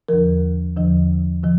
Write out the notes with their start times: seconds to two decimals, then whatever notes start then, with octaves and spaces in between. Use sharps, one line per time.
0.09 E2 D3 F3 A#4
0.76 E2 D3 F3
1.43 D3 F3